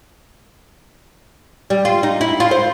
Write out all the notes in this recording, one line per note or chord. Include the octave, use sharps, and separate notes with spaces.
G3
F4
D#4
E4
F4
C5